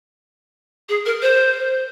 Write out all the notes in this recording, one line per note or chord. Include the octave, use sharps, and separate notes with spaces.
G#4
A#4
C5